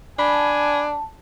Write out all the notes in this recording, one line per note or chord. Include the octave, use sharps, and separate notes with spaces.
D4 G#5 A5 B5